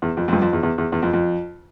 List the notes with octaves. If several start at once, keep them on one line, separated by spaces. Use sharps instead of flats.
E2
F2
F2
G2
F2
E2
E2
E2
E2
F2
F2